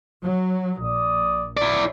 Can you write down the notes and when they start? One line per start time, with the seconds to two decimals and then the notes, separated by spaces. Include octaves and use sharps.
0.22 F#3
0.80 A#1 D5 D#6
1.57 E4 D5